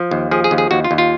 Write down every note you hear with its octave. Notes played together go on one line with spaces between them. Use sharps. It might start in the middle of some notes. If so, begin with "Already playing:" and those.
Already playing: F3
D#2
F3 G#4
G#4
D#2
G#4
D#2 F#4
F4
D#2
F4